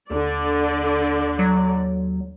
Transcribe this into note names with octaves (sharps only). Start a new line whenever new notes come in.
D#2 D3 D5
F#3